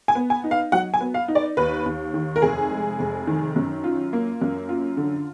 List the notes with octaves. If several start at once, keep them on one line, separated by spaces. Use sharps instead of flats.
G#5
B3
G#5
D#4
F5
F#3 F#5
G#5
B3
F5
D#4
D5
D#2 B4
D#2
D#3
A#4
F1 G#4
G#3
F1
D#3
F#2
F4
A#3
F#2
F4
D3